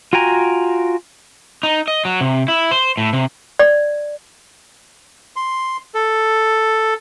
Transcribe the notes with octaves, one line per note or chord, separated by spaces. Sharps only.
F4 F#4 G5 G#5 A#5
D#4
D#5
F#3
C3
E4
C5
A2
C3
D5
C6
A4